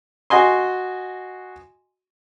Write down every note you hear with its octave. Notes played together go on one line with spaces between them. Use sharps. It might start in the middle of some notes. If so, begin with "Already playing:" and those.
F#4 D#5 G#5 C6